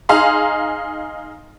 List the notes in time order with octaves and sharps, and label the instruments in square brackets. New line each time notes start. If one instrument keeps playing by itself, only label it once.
[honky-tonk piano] D#4 G#4 F5 A#5 C6